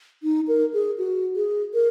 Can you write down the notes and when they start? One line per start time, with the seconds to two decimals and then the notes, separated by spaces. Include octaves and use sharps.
0.23 D#4
0.48 A#4
0.74 G#4
0.98 F#4
1.36 G#4
1.74 A#4